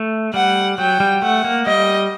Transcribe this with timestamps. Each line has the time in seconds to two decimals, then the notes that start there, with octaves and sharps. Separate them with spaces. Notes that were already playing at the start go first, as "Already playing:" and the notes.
Already playing: A3
0.34 G3 F#5
0.78 F#3 G5
1.00 G3
1.22 A3 F#5
1.44 A#3
1.66 G3 D#5